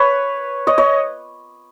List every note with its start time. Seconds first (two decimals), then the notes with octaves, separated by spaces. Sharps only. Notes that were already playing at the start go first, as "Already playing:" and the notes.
Already playing: B4 C#5
0.67 C#5 D#5
0.78 C#5 D#5